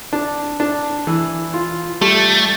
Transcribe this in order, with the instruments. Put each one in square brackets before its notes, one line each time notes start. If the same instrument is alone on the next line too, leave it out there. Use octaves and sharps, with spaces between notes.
[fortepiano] D4
D4
E3
F4
[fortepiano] G3 [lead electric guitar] A3